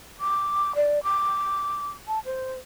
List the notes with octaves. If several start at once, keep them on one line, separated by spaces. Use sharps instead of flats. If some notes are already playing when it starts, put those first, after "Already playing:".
D6
D5
D6
A5
C5